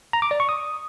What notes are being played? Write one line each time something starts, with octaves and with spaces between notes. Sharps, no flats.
A#5
D6
D5
C#6
D#6